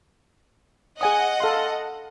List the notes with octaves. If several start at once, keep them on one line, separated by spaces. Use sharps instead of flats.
G#4 D#5 F#5 G#5 D#6
A4 F5 C6